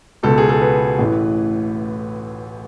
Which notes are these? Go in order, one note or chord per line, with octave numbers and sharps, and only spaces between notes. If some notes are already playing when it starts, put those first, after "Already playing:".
C#2 B2 A4
G#4
A4
B4
A1 A2 E3